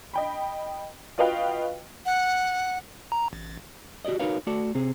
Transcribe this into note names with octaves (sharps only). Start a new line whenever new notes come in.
D#5 G5 B5
F4 F#4 B4 D#5 F5 G5
F#5
A#5
A1
F#4 G4 B4 D5 D#5
D#4 F#4 A#4 B4 C#5 F5
A3 F#4 A4 D5
C3 C4 G#4